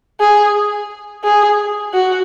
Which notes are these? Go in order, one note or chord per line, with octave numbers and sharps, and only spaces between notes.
G#4
G#4
F#4